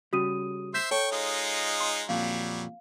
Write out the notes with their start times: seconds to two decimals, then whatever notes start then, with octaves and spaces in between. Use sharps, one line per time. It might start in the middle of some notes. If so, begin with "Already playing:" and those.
0.13 C#3 G3 F#4 D#6 D#7
0.74 C5 E5 C6 G6 B6 E7
0.91 A4 C#5 G5 C#6
1.11 G#3 D#4 F4
1.80 C6
2.09 F2 A#2 F#3 G3 F5